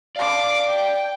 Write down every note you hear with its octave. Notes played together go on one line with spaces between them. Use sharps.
D5 F5 A5 D6
G5